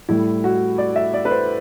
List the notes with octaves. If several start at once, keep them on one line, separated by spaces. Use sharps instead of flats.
A2 G3 E4
F#4
D5
E5
D5
B4
C5